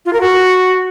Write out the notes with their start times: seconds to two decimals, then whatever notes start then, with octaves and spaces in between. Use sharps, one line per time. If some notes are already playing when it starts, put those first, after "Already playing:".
0.06 F4
0.13 A#4
0.21 F#4